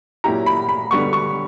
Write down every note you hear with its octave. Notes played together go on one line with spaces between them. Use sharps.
A#2 F#3 C#4 E4 G4 A#5
B5
B5
D3 G3 B3 C#6
C#6